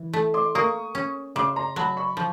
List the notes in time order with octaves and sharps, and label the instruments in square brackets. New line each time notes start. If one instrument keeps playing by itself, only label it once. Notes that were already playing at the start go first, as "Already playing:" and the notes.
Already playing: [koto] E3
A3
[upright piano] C6 D6
[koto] A#3 [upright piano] C#6 D#6
[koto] C#4
[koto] C#3 [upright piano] C6 D6
[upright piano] A#5 C6
[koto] F#3 [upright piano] A5 B5
[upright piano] B5 C#6
[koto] F3